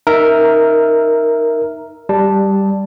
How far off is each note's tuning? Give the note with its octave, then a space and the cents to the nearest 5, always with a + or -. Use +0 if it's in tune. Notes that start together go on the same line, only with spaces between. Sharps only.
D#4 +0 A#4 +0 E5 +0
G3 +0 A5 +0